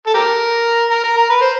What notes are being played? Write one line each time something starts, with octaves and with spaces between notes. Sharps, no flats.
A4
G4 A#4
A#4
A#4
A#4
B4
C5